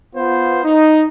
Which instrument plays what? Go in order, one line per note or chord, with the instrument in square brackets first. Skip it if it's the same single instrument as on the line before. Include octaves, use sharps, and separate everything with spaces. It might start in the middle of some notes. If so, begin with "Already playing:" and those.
[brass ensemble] B3 F4 C5
D#4